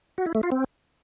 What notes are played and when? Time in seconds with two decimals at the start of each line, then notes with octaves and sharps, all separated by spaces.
0.18 F#4
0.26 E4
0.35 A3
0.43 F4
0.52 C4